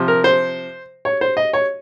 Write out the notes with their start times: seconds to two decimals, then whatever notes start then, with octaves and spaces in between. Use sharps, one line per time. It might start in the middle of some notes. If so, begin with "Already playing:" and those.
Already playing: C3 F3
0.08 A#4
0.24 C5
1.05 C#5
1.21 C5
1.37 D#5
1.53 C#5